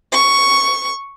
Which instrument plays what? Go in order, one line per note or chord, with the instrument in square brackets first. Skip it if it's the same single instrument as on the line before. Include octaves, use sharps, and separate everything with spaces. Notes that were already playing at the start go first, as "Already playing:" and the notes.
[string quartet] C#6